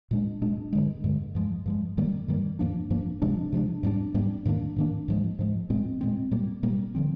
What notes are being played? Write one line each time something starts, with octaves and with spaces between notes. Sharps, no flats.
A#2 G#3 D4
A#2 G#3 D4
G2 D3 G#3
G2 D3 G#3
G2 F3 G#3
G2 F3 G#3
G2 D#3 G3 A#3
G2 D#3 G3 A#3
G2 F3 A#3 D4
G2 F3 A#3 D4
C3 F3 G#3 D4
C3 F3 G#3 D4
G#2 G3 A#3 D4
G#2 G3 A#3 D4
G#2 D#3 A#3 D4
G#2 D#3 A#3 D4
G#2 F3 G#3
G#2 F3 G#3
A#2 G#3 C4
A#2 G#3 C4
A#2 G3 A#3
A#2 G3 A#3
D3 F3 C4